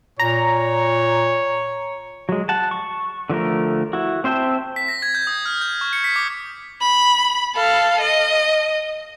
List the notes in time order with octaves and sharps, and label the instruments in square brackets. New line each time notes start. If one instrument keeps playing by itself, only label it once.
[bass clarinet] A#2 [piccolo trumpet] C#5 [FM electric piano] A#5
[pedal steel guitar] F#3 G#3
F#5 A5
C#6
D3 F3 A3 A#4
E4 F#4
C4 C5 E5 G5 A5
[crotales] B6
A#6
G#6
G6
D#6
F6
G6
C#6
C#7
B6
D6
[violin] B5
A4 F5
D#5